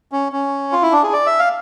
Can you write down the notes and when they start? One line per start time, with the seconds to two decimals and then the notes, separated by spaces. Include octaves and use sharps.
0.12 C#4
0.32 C#4
0.72 F4
0.83 E4
0.92 D4
1.03 G#4
1.13 D5
1.26 E5
1.39 F5